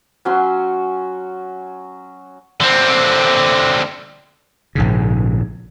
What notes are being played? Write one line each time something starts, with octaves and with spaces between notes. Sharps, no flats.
F#3 C#4 F#4 C6
D3 C4
A#1 G#2 C#3